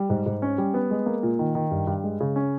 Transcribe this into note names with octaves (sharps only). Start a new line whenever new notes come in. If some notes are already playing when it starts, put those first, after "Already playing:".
Already playing: G3
G#2
G#2
C#4
G3
B3
G#3
A#3
A#2
D#3
D#3
G2
G2
G#3
C#3
C#4